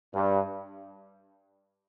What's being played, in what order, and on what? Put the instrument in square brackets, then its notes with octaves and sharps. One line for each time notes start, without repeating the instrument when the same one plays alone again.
[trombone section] G2